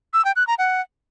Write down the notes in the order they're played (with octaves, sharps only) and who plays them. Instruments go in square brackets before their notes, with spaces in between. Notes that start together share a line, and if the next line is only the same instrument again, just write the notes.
[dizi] E6
G5
F#6
A#5
F#5